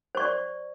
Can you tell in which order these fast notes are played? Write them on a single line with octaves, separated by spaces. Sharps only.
C5 C#6 D5